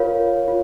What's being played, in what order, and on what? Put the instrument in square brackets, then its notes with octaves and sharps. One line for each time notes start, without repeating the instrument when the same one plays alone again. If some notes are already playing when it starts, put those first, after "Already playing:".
Already playing: [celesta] F4 A#4 C#5 F5
F4